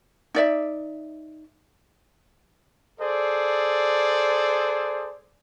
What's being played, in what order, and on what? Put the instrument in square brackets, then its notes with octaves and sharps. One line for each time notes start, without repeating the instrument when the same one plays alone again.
[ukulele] D#4 D5 E5
[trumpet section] G#4 A4 C5 D5